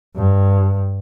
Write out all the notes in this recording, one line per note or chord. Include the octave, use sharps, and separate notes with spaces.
G2